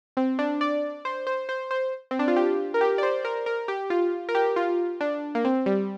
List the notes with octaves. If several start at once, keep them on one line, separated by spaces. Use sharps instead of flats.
C4
D4
D5
C5
C5
C5
C5
C4
D4
F4
G4
A#4
G4
D5
C5
A#4
A#4
G4
F4
A#4
G4
F4
D4
A#3
C4
G3